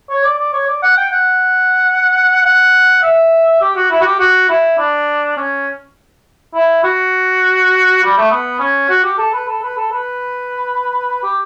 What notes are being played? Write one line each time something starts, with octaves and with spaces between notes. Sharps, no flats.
C#5
D5
D5
C#5
D5
F#5
G5
F#5
F#5
E5
G4
F#4
E4
F#4
G4
F#4
E4
D4
C#4
E4
F#4
G3
A3
B3
C#4
F#4
G4
A4
B4
A4
B4
A4
B4
G4